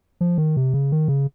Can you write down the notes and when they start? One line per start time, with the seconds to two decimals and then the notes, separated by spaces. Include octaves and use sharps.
0.21 F3
0.38 D#3
0.57 C3
0.74 C#3
0.92 D#3
1.08 C#3